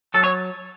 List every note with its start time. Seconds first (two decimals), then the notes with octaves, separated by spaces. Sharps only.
0.14 F#3 A4
0.24 C#5